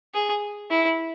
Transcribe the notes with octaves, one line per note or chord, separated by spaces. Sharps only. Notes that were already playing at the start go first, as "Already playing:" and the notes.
G#4
E4